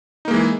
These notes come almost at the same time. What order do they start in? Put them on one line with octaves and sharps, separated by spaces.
D#4 A#3 G#3 E3